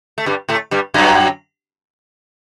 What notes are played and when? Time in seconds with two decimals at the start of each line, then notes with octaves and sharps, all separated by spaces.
0.18 A3
0.26 G2 G3
0.49 A2 A3
0.71 G2 G3
0.94 F#2 F#3